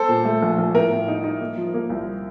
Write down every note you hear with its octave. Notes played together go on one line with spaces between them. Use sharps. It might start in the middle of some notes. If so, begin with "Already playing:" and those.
Already playing: A4 C5
A#2
A3
A#1
A#1
A2 A#4
A2
D#4
D#4
A#3
F3
A#3
C2